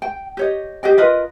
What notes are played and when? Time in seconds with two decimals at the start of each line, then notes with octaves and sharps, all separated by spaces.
0.02 G5
0.37 G4 C#5 D#5
0.83 G4 G#4 D#5 G5
0.98 F4 A#4 B4 D#5